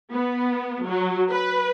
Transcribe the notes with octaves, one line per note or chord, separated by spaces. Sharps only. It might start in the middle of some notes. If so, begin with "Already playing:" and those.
B3
F#3
B4